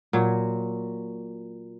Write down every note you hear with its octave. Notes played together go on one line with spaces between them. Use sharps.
A#2 F#3